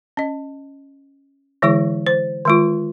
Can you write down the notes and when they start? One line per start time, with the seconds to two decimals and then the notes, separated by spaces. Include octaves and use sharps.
0.17 C#4 D#5
1.62 D3 E3 G#3 E4 G#4 C#6
2.07 C5
2.45 D#3 G#3 F4